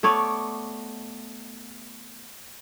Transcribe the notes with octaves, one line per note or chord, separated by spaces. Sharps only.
A3 B3 C#5 D5